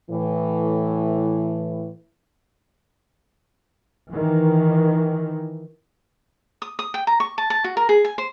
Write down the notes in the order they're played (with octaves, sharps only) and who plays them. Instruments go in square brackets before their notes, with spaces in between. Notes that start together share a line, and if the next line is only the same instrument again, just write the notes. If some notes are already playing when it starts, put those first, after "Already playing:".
[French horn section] A2 E3
[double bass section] D#3 E3
[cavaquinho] D#6
D#6
G5
A#5
C#6
A5
A5
F#4
A#4
G#4
G#5
C5